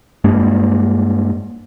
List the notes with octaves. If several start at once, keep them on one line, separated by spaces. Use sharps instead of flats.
G2 G#3 A#3 D4